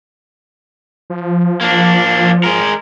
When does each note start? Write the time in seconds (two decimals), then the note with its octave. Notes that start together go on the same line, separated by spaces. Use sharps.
1.10 F3
1.61 A#3 D4
2.44 G#3 A#4